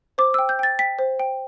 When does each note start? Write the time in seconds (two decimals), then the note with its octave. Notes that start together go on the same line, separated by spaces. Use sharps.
0.18 C5 D6
0.34 E6
0.39 G5
0.49 G6
0.59 G5 A6
0.79 G5 B6
0.99 C5
1.20 G5